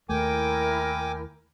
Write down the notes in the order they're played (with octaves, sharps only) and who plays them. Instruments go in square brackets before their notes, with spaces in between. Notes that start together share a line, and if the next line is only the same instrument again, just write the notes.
[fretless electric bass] D#2 A3 [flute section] E4 A#4 [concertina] G5 G#5 D6